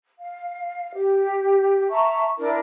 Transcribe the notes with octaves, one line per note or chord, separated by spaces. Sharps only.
F5
G4
E5 A5 A#5 C#6
D4 E4 A#4